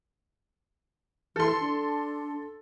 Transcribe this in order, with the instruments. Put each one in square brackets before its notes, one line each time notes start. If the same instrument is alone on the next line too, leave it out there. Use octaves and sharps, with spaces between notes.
[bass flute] E3 [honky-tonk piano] A4 C6
[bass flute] D4